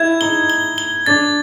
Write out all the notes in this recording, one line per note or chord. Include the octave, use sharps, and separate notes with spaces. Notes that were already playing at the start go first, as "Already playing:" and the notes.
Already playing: E4 G#6
D#4 G7
G7
G7
D4 A6